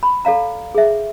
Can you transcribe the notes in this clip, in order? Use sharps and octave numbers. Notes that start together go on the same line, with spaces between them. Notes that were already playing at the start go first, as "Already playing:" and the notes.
B5
A4 D5 F5 A#5
G#4 E5